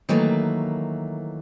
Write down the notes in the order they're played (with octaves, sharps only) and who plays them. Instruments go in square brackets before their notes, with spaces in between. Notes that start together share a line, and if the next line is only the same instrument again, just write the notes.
[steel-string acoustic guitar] D#3 E3 F#3 A3 A#3 B4